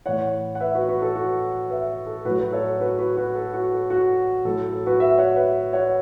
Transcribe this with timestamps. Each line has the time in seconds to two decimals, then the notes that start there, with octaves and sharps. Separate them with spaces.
0.06 A2 E3 C#5 F#5
0.55 F#5
0.60 B4 E5
0.74 F#4 B4
0.89 F#4 B4
1.02 A4
1.15 F#4
1.70 B4 E5
2.06 A4
2.25 A2 F#3 F#4 B4
2.39 F#4 B4
2.52 A4 C#5
2.81 F#4 B4
2.98 F#4 B4
3.17 F#4 B4
3.35 A4
3.54 F#4
3.72 A4
3.90 F#4
4.45 A2 F#3 A4
4.73 A4
4.86 F#4 B4
5.00 B4 E5
5.18 C#5 F#5
5.36 B4 E5
5.73 C#5 F#5